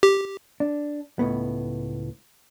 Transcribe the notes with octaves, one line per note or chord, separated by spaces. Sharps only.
G4
D4
C#2 A2 B3